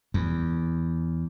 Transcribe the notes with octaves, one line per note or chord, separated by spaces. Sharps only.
E2